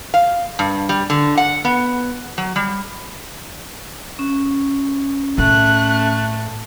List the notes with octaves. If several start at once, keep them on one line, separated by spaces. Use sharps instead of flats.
F5
G2
G3
D3
F#5
B3
F#3
G3
C#4
A2 A3 F#6